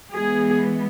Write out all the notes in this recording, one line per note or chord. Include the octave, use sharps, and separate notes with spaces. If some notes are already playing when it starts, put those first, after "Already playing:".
E3 G#3 B3 G#4